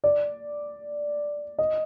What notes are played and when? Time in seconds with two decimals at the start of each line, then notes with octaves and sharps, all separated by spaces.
0.04 D5
1.58 D#5